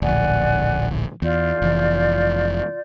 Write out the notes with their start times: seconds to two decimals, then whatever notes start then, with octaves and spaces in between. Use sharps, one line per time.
0.02 D1 A#1 D5 F#5 G#5
1.22 E2 F4 D5 G6
1.62 F1 E3